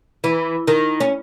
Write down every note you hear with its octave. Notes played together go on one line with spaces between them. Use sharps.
E3
D#3
C#4